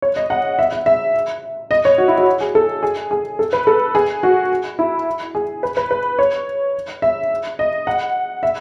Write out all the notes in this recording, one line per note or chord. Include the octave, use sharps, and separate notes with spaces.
C#5
D#5
F#5
E5
E5
E5
D#5
C#5
F#4
E4
F#4
G#4
A4
G#4
G#4
A4
B4
A4
G#4
F#4
E4
G#4
B4
B4
B4
C#5
E5
D#5
F#5
E5